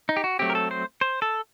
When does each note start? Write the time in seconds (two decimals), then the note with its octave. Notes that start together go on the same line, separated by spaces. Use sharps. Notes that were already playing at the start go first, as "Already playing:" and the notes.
0.09 D#4
0.17 G4
0.24 F#4
0.39 F#3 A3 C4 G4
0.50 A#4
0.55 A4
0.71 C5
1.01 C5
1.22 A4